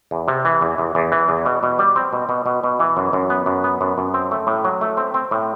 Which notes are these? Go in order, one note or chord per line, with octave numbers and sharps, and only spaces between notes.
E2
C3
E3
E2
E2
E2
E3
E2
B2
B2
G3
C4
B2
B2
B2
B2
E3
F#2
F#2
B3
F#2
B3
F#2
F#2
C4
A3
A2
F#3
A3
C4
C4
A2